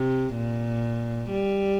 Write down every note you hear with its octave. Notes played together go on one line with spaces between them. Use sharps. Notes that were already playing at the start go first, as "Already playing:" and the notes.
Already playing: C3
A#2
G3